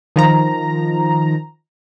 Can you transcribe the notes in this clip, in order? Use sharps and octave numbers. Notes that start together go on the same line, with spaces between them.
D#3 F3 A#5